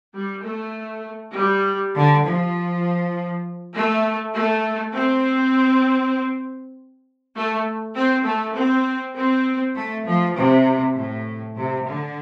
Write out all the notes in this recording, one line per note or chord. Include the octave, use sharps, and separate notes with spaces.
G3
A3
G3
D3
F3
A3
A3
C4
A3
C4
A3
C4
C4
A3
F3
C3
A2
C3
D3